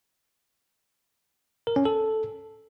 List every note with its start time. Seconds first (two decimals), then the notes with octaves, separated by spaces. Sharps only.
1.67 A#4
1.76 C#4
1.85 A4